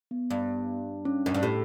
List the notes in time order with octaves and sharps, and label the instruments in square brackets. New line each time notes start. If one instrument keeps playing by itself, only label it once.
[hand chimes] B3
[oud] G2
[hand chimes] C#4
[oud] F#2
G2
[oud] A2 [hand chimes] G4